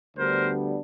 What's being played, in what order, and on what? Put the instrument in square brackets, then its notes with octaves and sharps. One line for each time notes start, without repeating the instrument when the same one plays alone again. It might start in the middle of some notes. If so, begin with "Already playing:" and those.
[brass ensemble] D2 G3 B3 D4 A#4 C5